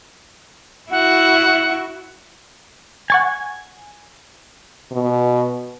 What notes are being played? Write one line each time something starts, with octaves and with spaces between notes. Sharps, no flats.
E4 F#4 F#5
F#5 G#5 C#6 A6
B2